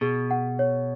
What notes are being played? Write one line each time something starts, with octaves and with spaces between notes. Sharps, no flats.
B2 G#4
F#5
C#5